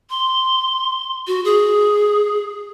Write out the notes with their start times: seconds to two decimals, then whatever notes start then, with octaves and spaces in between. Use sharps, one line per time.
0.10 C6
1.27 F#4
1.45 G#4